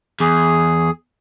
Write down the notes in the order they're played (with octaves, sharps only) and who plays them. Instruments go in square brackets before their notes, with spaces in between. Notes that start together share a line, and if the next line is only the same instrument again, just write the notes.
[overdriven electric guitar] E2 [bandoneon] G#4